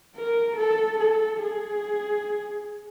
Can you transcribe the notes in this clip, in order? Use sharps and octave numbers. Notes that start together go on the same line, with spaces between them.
A#4
A4
A4
G#4